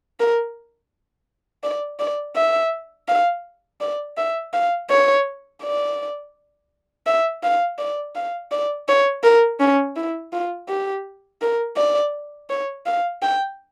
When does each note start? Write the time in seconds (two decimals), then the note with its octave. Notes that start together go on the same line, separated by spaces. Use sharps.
0.19 A#4
1.63 D5
1.99 D5
2.36 E5
3.08 F5
3.80 D5
4.17 E5
4.53 F5
4.90 C#5
5.62 D5
7.07 E5
7.43 F5
7.78 D5
8.15 F5
8.51 D5
8.88 C#5
9.23 A#4
9.60 C#4
9.96 E4
10.32 F4
10.68 G4
11.41 A#4
11.77 D5
12.50 C#5
12.86 F5
13.22 G5